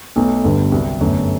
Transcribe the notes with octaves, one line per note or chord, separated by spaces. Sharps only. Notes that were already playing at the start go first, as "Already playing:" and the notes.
B1 B2 A3
G1 G2 D3
C2 C3 F#3
G1 F#2 D3 A3